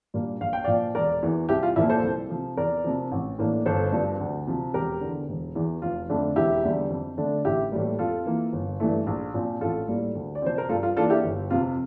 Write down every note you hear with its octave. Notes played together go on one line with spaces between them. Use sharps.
A#2 G3 A#3 D4
A#1 F5
G5
A#2 F3 D5 F5
E1 A#4 D5
E2 E3
C2 E4 G4
F4
A#2 F3 A#3 E4
A4 C5
C2
C3 F3
E2 A#4 D5
C3 F3
A1
A2 E3 A#3 D4
G1 A4 C5
G2 F3 C4
D2
C3 F3
E1 G4 A#4
E2 D3
E1
E2 E3
F1 F4
F2 D3 A3 D4
E1 E4 G4
E2 D3 G3
F2
D3 A3 D4
A1 E4 G4
A2 E3 G3 A#3
F2 F4 A4
E3 A#3
G1
G2 E3 A3
A#1
A#2 F3 C4
A1 F4 A4
A2 G3 A#3
D2
D5
C3 F3 C4 C5
A#4
G2 F4 A4
F4
E3 A#3 D4 F4 A4
E4 G4
G1
F2 C3 F4